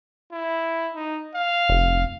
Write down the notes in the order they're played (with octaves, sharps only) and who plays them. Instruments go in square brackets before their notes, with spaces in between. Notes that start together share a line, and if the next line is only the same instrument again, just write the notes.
[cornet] E4
D#4
F5
[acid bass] F1